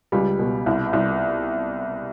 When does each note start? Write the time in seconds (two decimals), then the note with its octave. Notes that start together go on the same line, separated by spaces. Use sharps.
0.12 C#2 G3
0.39 B2
0.66 C2
0.93 C2